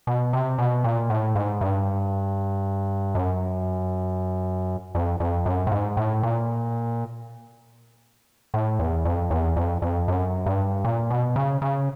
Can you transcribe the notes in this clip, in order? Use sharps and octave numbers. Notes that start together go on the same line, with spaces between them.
B2
C3
B2
A#2
A2
G#2
G2
F#2
F2
F2
F#2
A2
G#2
A2
A#2
A2
E2
F2
E2
F2
F2
F#2
G2
A#2
B2
C#3
C#3